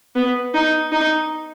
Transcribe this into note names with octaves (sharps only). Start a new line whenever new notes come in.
B3
D#4
D#4